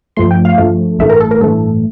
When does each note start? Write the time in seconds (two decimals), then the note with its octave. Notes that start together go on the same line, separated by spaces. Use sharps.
0.17 G2 F3 A3 C6
0.31 G5
0.45 F5
0.58 G2 F3 A3
0.99 A1 G2 E3 A3 E5
1.10 A#4
1.20 A4
1.31 A#4
1.40 A1 G2 E3 A3 A4